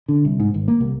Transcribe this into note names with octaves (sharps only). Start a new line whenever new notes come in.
D3
C2
G#2
G#1
A#3
C2